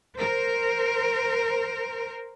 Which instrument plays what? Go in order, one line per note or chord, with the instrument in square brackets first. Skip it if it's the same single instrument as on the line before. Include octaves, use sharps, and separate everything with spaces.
[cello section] A#4 C5